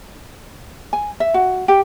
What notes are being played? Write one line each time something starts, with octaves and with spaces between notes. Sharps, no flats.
G#5
E5
F#4
G4